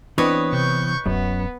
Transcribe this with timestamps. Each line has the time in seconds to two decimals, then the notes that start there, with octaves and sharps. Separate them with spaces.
0.18 E3 B3 C4 D4 B4 C#5 D#5
0.53 C3 C#6 G6
1.06 D1 F#2 B3